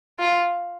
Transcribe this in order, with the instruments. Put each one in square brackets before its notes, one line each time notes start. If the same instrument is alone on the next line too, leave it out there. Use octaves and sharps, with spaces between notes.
[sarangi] F4